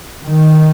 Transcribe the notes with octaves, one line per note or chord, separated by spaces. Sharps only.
D#3